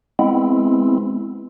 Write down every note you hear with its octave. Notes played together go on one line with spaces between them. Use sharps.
G#3 B3 C4 E4